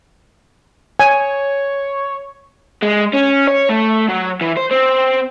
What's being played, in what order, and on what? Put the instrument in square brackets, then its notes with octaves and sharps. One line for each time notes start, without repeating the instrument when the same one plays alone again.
[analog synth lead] C#5 [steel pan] G#5
[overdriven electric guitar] G#3
C#4
C#5
A3
F#3
E3
C5
C4